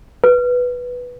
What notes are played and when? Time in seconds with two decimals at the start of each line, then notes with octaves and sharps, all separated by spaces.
0.24 B4